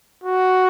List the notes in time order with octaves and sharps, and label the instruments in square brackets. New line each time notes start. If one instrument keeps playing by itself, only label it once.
[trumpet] F#4